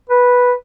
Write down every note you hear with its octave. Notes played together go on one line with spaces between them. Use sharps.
B4